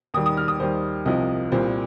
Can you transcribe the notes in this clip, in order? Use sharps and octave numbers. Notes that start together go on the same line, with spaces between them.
D#2 D#3 G3 D#6
D#6
F6
D#6
D#2 D#3 G3 C5
C2 C3 F3 D#5
C2 A#2 G3 C5